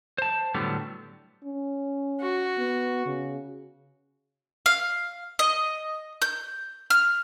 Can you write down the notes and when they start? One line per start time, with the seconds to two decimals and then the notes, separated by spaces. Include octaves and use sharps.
0.18 C5 A5
0.54 A2 D3 F#3 G3 B3
1.44 C#4
2.21 F#4
2.58 B3
3.06 C#3
4.66 F5
5.39 D#5
6.22 G6
6.90 F6